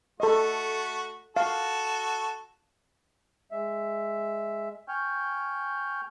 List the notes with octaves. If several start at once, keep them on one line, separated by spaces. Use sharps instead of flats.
A3 F#4 A4 D#5
F#4 A4 F5
G#3 E5
G5 G#5 C#6 F6 G6